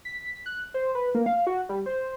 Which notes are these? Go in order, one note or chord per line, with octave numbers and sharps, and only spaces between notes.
B6
F#6
C5
B4
A#3
F5
F#4
G3
C5